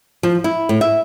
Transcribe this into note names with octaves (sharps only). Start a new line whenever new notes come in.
F3
E4
A2
E5